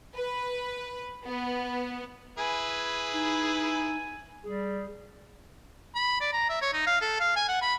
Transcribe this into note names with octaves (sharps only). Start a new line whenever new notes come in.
B4
B3
E4 G#4 B4 G#5
D#4
G3 G#4
B5
D5
A#5
E5
C#5
D#4
F5
A4
F5
G#5
F#5
B5